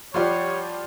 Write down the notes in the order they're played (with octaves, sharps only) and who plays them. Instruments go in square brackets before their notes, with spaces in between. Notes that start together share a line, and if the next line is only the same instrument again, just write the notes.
[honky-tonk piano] F3 F4 G4 [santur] G3 F#5 C6 [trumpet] C#5